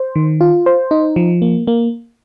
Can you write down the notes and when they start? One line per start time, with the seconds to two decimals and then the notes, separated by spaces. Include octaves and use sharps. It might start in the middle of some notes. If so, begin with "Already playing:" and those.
Already playing: C5
0.16 D#3
0.41 F4
0.66 C5
0.91 D#4
1.16 F3
1.42 A#3
1.67 A#3